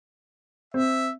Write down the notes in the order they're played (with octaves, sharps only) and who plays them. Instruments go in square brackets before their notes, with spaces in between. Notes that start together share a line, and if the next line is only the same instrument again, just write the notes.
[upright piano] C4 [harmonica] E5